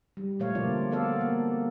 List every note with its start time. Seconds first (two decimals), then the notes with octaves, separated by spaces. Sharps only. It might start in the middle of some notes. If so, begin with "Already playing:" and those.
0.17 G3
0.39 A#2 F3 A3 C#5 F5
0.55 B2 D3 A#3 F4 D5
0.91 A#3 B3 A4 D5 F5
1.21 A#3